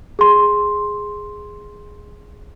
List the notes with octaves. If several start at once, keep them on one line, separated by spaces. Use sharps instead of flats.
G#4 C6